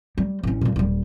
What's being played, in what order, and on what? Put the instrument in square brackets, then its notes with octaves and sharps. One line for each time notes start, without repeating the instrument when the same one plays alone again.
[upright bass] G3
A1 C#4
G2 A#2
D#1 G3